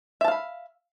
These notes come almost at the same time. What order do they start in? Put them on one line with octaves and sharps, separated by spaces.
E5 A5 F5 B5